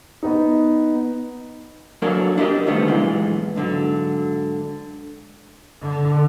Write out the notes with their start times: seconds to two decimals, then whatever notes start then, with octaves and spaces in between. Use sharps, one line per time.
0.23 B3 D#4
2.02 F#3 A#3 D4 A4 A#4 C#5
2.38 D4 E4 G4 A#4 D#5
2.66 D3 D#3 F3 G3 A3 B3
2.88 B1 A#2 E3 G#3
3.56 G#2 D3 F#3
5.83 D3